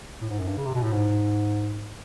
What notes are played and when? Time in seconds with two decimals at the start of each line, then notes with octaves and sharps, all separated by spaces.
0.21 A2
0.30 G#2
0.39 F#2
0.48 G2
0.57 C#3
0.66 C3
0.75 B2
0.83 A2
0.92 G#2